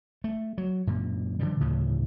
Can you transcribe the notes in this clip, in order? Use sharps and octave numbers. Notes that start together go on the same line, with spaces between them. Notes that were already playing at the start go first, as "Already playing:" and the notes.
A3
F#3
F#2 A#2 D3
D3 F3 G3
D2 A2 C#3 E3